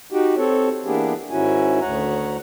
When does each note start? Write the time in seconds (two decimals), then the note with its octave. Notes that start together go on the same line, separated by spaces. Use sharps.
0.12 D#4 F#4 G4
0.37 C4 A4 C#5
0.85 E3 A#3 B3 D4 G4 G#4
1.31 G#2 D#3 C#4 E4 F#4 G#5
1.81 D2 C#5 F#5 A#5